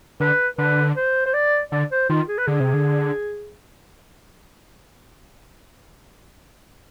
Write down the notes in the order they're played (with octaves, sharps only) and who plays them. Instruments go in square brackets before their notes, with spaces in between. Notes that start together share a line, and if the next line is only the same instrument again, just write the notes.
[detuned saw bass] D3 [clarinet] B4
[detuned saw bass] D3 [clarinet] B4
[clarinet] C5
C5
D5
[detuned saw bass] D3 [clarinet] D5
[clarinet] C5
[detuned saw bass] D#3 [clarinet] F4
[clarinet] G#4
B4
[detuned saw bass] D3 [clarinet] G#4
[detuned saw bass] C3
D3